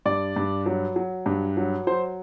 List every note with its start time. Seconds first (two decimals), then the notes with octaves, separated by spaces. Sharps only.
0.06 G2 D5
0.36 G2
0.66 F#3
0.96 F#3
1.26 G2
1.57 F#3
1.87 F#3 C5